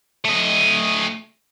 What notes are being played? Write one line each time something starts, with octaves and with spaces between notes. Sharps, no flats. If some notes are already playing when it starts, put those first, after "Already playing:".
A3 D#5